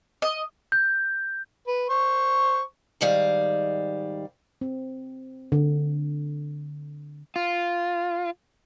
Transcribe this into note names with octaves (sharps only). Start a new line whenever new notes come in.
D#5
G6
B4
C5 C#6
G#2 D#3 G3 F5
C4
D3
F4